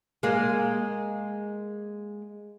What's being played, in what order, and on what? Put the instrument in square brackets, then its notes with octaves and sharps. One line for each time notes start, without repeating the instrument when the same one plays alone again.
[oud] G#3 A#3